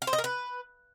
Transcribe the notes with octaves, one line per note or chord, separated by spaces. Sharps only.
F5
C5
D#5
A#4
B4